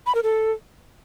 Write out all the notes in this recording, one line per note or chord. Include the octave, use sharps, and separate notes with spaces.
B5
A#4
A4